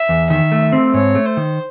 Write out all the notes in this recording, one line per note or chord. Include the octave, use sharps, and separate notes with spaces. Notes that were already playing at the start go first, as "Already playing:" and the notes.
Already playing: E5
E2
D#3 E5
A3
C4
G#2 C#5
A3
C5
D#3